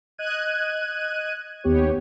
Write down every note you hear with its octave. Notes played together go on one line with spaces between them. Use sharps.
D#5 F#6 G#6 D#7
D#2 B3 G4 C#5